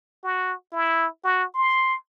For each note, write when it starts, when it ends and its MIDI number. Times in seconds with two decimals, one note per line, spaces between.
0.24 0.54 66
0.73 1.07 64
1.24 1.45 66
1.55 1.97 84